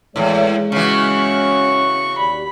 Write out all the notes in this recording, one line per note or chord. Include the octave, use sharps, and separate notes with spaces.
E2 A2 G#3 C#5
C#3 E3 C#4 F#4 C#6
D#2 G4 D5 B5